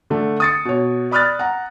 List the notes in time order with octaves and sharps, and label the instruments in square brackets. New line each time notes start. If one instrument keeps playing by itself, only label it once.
[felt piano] D3 A3
D#6 A6 C#7
B2 C#5
D5 B5 D#6 F6 F#6 A6
F#5 A#5